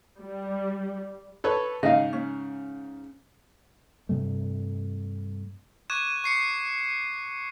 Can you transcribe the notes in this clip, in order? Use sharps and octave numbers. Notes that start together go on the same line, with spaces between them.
G3
A4 B4 C#5
G#2 C#3 D#5 F5
C#4
G2 C3 G3 A3
C#6 D6 F#6 G#6 D#7 E7
C#6 C7 C#7